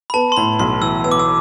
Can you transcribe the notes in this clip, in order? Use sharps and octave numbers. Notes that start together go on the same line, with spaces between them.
B5
B3 A5
C6
A2 B5
B1 C6
E3 E6
B3 E6
D6
E6